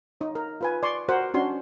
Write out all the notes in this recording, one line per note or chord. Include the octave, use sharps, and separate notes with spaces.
D#4 C#5
A#4
F4 B4 G#5
D5 C6 C#6
F#4 A#4 C5 F#5
C#4 D4 F#4 C6